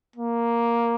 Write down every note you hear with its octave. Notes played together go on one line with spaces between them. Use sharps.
A#3